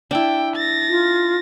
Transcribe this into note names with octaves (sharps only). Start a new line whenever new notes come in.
D4 E4 G5
A6 A#6
F4